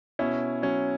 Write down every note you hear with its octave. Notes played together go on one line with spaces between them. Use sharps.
B2 C#4 E4
F#3 C#4